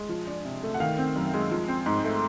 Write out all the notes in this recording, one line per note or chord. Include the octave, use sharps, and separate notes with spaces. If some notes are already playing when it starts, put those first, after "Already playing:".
Already playing: G#3
F3
D4
C3
A3
F#5
D#3 F5
C4
F#2
G#3
F3
C4
G#2
A3